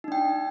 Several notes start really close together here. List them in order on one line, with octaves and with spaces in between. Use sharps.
D#4 D4 G5